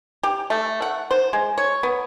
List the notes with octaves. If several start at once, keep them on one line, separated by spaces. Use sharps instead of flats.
G4
A3
F#5
C5
G#3
C#5
B3